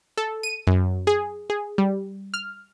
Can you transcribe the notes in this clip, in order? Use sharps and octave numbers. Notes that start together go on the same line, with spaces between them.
A4
D#7
F#2
G#4
G#4
G3
F6